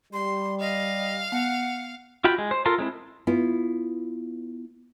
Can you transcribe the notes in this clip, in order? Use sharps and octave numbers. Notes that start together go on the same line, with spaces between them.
G3 C6
D#5 F5
B3 F#5
F4 F#4 G5 B5
G#3
C5
F4 A4 A#4 C6
G#3 C4 E4
B3 E4 F4